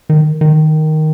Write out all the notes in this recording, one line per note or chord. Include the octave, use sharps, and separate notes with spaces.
D#3
D#3